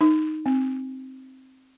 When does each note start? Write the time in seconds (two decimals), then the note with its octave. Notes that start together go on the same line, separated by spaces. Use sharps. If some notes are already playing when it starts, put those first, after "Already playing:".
0.01 D#4
0.46 C4